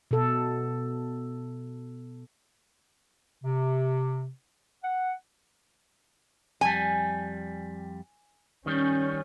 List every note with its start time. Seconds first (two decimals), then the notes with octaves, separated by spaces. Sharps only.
0.11 B2 A4
3.44 C3
4.84 F#5
6.61 F2 G3 G#5
8.66 D#3 G3 C#4